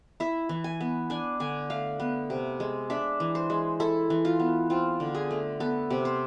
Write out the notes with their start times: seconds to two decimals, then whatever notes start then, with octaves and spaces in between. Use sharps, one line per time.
0.20 E4 E5
0.49 E3
0.64 G#5
0.81 B3
1.10 D4 G#5
1.40 D3 G#5
1.70 A3 F5
2.00 B3
2.30 C3
2.60 G#3
2.90 D4 E5
3.20 E3
3.35 C5
3.50 G#3
3.80 E4 A4
4.10 E3
4.25 F4
4.40 B3
4.70 C4 F4
5.00 D3
5.15 G#4
5.31 A3
5.60 B3 A4
5.90 C3
6.05 C5